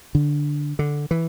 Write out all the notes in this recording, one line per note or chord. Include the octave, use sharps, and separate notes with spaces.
D3
D3
E3